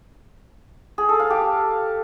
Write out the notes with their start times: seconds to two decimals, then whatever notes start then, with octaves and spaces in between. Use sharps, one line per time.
0.98 G#4
1.09 A4
1.19 F5
1.30 G4